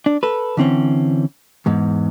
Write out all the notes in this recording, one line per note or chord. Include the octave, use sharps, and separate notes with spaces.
D4
A4 B4
D3 E3 C4 C#4
E2 G#2